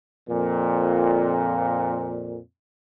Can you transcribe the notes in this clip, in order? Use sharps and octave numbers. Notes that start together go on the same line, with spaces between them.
F2 A#2